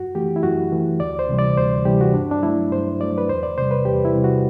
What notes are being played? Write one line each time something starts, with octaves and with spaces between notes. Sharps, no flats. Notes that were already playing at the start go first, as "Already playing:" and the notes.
Already playing: F#2 F#4
E3 A3 G4
E4
F#2 F#4
E3 A3
D2 D5
C5
C3 E3 G3
D5
D2 C5
C3 E3 G3 G4
F#4
G2 D4
D4
F#3 A3 E4
G2 C5
F#3 A3 D5
B4
E2 C5
D5
C3 G3 C5
B4
E2 G4
E4
C3 G3
F#4